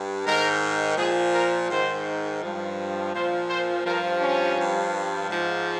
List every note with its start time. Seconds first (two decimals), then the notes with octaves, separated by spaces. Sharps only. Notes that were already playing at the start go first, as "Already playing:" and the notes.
Already playing: G2
0.26 G#2 D#3 A#4
0.97 A#2 F3 G#4
1.33 A#4
1.70 G#2 D#3 C5
2.42 G2 F3
3.13 A#2 F3 C5
3.49 C5
3.85 G2 F3 A#4
4.21 C#4
4.57 G2 F3
5.29 G#2 F3